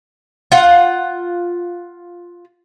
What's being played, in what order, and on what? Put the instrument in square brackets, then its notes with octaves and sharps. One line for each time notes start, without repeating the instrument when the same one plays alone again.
[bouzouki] F4 F#5